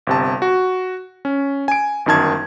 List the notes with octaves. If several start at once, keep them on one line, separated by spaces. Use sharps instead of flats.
G1 C3 A5
F#4
C#4
G#5 D7
G1 F#2 D#3 A5 G#6